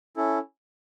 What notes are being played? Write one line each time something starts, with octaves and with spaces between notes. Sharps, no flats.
C#4 E4 A4